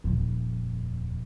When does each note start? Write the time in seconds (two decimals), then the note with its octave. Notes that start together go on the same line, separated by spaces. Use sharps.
0.04 D#1 F2